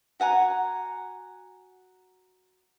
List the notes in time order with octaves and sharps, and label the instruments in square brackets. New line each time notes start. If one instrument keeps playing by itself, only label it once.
[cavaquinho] F#4 F#5 G#5 A#5